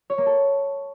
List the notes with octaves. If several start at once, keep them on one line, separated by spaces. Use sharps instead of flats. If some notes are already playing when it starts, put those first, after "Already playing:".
C#5
A#3
A4